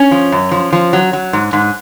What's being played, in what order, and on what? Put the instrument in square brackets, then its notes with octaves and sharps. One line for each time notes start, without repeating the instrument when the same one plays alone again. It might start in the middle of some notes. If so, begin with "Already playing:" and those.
Already playing: [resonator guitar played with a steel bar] C#4
F3
F#2
F3
F3
F#3
F#3
G#2
G#2